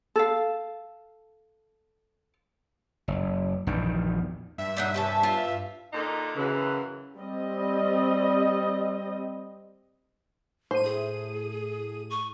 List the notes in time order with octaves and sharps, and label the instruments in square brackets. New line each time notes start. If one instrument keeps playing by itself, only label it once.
[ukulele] A4 F5
[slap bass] F#1
A#1 E2 G2 D#3
[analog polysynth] G2 E5
[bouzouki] A#2 D#4 F#5
C3 C#4 A5
F4
[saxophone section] A#2 D3 D#4
[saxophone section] F#2 E3 [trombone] C#3
[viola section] G3 C4 D#5
[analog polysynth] A2 D#7 [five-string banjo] C5
[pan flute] G#4
C#6